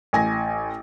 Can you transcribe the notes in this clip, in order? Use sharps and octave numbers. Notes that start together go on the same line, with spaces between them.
A1 G#5 A#6